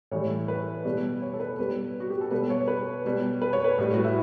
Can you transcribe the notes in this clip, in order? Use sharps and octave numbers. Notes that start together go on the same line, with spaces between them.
A2 E3 G3 C#5
B4
B2 G3
C#5
A4
B4
B2 G3 B4
F#4
G4
A4
B2 G3 B4
C#5
B4
B2 G3
B4
C#5
B4
A2 G3
F#4
E4